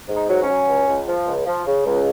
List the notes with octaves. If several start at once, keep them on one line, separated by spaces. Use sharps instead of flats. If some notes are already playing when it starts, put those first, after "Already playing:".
G#2
D#4
F#3
C#4
F#3
C#2
C#2
F3
C#2
F3
C#3
C#2